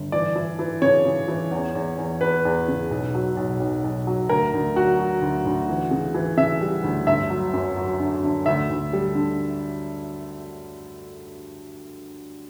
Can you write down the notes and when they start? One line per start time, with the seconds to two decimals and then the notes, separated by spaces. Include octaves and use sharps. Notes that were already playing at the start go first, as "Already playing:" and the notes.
Already playing: G1
0.12 E3 D5
0.36 E3
0.59 E3
0.82 C#3 C#5
1.05 C#3
1.28 E3
1.51 E2
1.75 E2
1.98 E2
2.21 E2 B4
2.45 E2
2.68 C#3
2.91 B1
3.14 F#3
3.37 B1
3.60 B1
3.84 B1
4.07 F#3
4.29 D2 A#4
4.53 D2
4.76 F#3 F#4
4.99 F#3
5.22 D2
5.45 D2
5.69 E3
5.91 C#3
6.14 E3
6.37 C#3 E5
6.61 G3
6.84 D2
7.07 G1 E5
7.30 F#3
7.53 F#2
7.76 F#3
8.00 D3
8.24 D3
8.46 D2 E5
8.70 D2
8.93 G3
9.15 D3